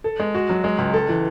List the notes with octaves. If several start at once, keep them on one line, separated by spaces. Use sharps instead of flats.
A4
G#3
F#4
F#3
G#3
C#2
A4
E3